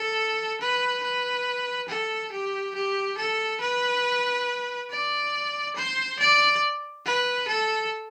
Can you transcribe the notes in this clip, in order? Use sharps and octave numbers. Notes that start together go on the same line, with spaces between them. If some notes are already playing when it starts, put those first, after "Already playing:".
Already playing: A4
B4
B4
A4
G4
G4
A4
B4
D5
C5
D5
B4
A4